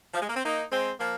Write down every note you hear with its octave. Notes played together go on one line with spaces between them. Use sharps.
F3
G#3
A#3
C4
A#3 D#4
G#3 C4
F3 A#3